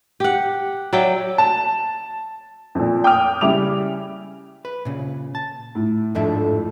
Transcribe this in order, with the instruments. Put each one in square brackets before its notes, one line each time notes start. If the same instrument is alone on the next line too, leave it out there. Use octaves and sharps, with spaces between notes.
[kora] G4 F#5
F#3 D5 E5 G5
[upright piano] A5
F2 A#2
G5 D6 D#6 F6
C#3 G3 E4 D6 F7
[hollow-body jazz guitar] B4
A#2 C#3
A5
[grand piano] A2
[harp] F2 A4 [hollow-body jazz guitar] G#2 D4 E5